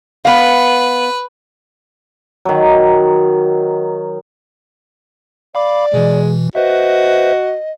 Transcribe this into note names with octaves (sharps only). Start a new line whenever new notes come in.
B3 B4 F5
D#3 F#3
D5 F5 B5 D6
B2 E3 G#3
F#4 B4 C5 D#5 E5